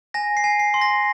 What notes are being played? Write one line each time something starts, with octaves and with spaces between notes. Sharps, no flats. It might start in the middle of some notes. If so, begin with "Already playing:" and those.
G#5 A#6
C7
G#5
C7
C6
A#6